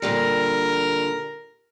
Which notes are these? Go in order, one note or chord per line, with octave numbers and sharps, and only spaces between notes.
A#2 D3 G3 A#4